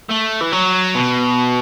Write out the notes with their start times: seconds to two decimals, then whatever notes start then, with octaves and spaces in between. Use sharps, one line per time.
0.09 A3
0.41 E3
0.52 F#3
0.95 B2